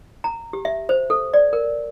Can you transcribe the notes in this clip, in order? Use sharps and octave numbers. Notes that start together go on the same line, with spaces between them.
A#5
G4
E5
C5
A4
D5
A#4